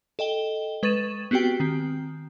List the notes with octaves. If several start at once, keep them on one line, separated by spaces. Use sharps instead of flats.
A4 D#5 G5 G7
G#3 B4 C#6 A6 D#7 E7
B3 C4 F#4 G4 G5
D#3 C4